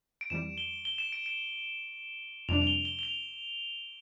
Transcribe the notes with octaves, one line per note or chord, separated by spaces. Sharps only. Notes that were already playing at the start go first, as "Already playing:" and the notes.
D7
F2 E3 G3 E7
G7
G7
E7
D7
D7
F2 C3 G3 D4 F7
F7
G7
G7
G7
F7